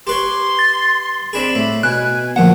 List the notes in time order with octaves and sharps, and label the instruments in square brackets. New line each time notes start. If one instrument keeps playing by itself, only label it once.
[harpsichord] G4 B4 C#5 [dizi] C6
[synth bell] A6
[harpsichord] C4 D4 G#4 [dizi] B5
[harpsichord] A2
[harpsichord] B2 [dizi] G#5 [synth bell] F#6
[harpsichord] D2 A#2 [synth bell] F3 F#5